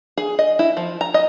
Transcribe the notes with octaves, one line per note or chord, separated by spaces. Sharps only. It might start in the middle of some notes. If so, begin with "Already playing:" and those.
G#4
D#5
E4
F3
A#5
D#5